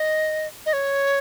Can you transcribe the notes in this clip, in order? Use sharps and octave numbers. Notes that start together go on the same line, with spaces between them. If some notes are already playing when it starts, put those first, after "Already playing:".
Already playing: D#5
D#5
C#5